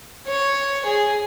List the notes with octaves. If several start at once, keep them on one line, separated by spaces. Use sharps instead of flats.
C#5
G#4